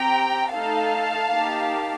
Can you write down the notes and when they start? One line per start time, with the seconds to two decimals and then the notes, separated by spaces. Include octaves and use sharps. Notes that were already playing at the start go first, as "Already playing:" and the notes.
Already playing: C4 G4 G5 A#5
0.50 A3 D#4 A4 F5 A5
1.32 A#3 D#4 G4